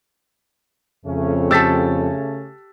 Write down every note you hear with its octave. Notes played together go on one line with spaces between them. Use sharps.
F2 C#3 A3 C#4
G4 A4 E6 A6 B6